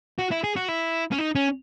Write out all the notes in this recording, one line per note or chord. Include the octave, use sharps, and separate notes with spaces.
F#4
E4
G#4
F#4
E4
C#4
D#4
C#4